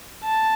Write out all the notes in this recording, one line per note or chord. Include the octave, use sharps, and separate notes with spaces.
A5